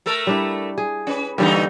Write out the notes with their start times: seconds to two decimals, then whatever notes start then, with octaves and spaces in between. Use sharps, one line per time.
0.06 A3 A4 A#4
0.27 G3 D4 E4
0.78 G#4
1.07 C#4 B4
1.38 G2 D3 E3 G3 A#3 D#4